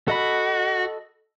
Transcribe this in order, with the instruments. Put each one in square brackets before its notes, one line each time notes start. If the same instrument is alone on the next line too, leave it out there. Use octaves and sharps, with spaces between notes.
[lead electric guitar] F#4 [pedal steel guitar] A4 D#5 B5